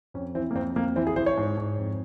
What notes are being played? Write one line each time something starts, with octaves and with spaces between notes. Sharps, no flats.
F2 C#4
E3 C4
A#3
F2 C4
F2 A#3
E3 C4
G#4
E3 C5
C#5
G#2
G#2
F2